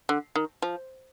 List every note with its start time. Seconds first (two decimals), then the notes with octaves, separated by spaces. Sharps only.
0.09 D3
0.35 D#3
0.62 F3